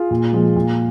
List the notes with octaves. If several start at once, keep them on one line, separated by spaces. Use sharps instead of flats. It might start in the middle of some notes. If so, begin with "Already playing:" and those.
Already playing: F4 G#4
A#2
F3 G#3
A#2